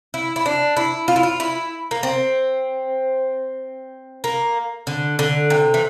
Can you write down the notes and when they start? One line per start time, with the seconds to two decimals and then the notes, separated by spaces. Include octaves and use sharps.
0.14 E4
0.36 E4
0.46 D4
0.77 E4
1.08 F4
1.16 E4
1.23 F4
1.40 E4
1.91 A#3
2.03 C4
4.24 A#3
4.87 D3
5.19 D3
5.50 C3
5.74 E3